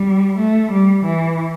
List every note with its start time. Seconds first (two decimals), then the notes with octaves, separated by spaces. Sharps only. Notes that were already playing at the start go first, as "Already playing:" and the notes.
Already playing: G3
0.38 A3
0.71 G3
1.05 E3